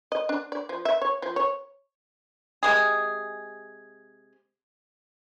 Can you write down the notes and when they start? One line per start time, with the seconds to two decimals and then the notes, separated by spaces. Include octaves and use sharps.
0.12 D#5
0.29 D4
0.52 D5
0.69 F3
0.85 E5
1.01 C#5
1.22 F3
1.36 C#5
2.63 C3 G#3 G#4